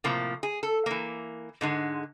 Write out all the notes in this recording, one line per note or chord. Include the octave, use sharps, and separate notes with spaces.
A2 C3 F3 A#3
G#4
A4
E3 A#3
G#2 D3 G#3